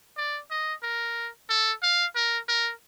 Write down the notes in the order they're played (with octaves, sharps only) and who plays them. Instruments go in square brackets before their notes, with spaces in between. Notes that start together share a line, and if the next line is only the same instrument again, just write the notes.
[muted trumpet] D5
D#5
A#4
A4
F5
A#4
A#4